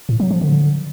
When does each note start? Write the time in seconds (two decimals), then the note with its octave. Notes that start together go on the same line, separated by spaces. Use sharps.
0.09 A2
0.20 F#3
0.31 F3
0.41 D3